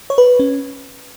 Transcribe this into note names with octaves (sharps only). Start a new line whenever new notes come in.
C#5
B4
C#4